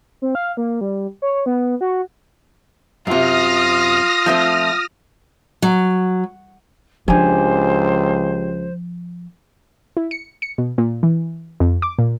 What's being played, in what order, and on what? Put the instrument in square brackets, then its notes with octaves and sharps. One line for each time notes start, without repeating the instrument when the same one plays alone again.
[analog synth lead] C4
F5
A#3
G3
C#5
B3
F#4
[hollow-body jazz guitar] F#2 C3 [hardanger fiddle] F4 [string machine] D#6 F6 A#6
[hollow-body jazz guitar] F3 A3 C4
[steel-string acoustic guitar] F#3
[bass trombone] C#2 [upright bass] F3 D4 [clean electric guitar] G4 G#5 [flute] C5
[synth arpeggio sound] E4
C#7
C#7
B2
A#2
E3
F2
D6
A#2